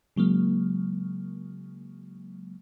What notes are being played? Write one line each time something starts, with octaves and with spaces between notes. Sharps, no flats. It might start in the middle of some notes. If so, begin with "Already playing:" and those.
C#3 F#3 G#3 A#3